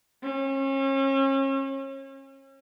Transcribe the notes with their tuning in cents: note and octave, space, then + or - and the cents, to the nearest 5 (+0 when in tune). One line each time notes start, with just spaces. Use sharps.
C#4 -35